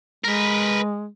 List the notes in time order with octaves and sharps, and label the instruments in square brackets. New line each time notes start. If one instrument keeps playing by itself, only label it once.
[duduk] G#3 [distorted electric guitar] A#4 B4